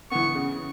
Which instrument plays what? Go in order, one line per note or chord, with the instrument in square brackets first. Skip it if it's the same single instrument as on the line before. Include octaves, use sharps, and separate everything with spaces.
[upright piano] E3 B3 [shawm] C#6
[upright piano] C#3